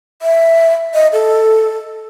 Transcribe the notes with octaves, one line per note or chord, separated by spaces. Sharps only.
E5
D#5
A4